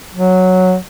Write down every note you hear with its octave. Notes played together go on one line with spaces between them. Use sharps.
F#3